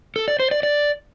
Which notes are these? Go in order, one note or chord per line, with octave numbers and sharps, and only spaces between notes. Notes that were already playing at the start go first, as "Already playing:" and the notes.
A4
D5
C5
D5
D5